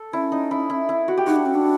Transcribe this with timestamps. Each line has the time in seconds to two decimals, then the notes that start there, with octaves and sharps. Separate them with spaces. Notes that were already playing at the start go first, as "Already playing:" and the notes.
Already playing: A4
0.13 C#4 E4
0.32 D#4
0.51 E4
0.70 E4
0.89 E4
1.08 F#4
1.17 G4
1.27 D#4 F#4
1.36 D4
1.46 C#4
1.55 D4